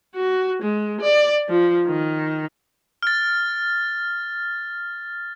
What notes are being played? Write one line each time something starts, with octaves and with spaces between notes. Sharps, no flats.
F#4
G#3
D5
F3
D#3
F6 A6